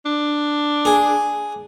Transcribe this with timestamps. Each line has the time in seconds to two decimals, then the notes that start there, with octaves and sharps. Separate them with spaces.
0.05 D4
0.85 G#4